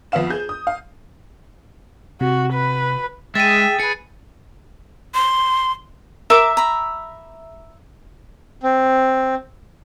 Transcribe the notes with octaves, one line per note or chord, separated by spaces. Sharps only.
F2 B3 E5 F5 E7
G#4 G6
D#6
F5
C3 F#4
B4
G#3 G#4 E5 G5 A6 D#7
G#4 B4 C#7
C6
A#4 E5 D6
A#5 B5
C4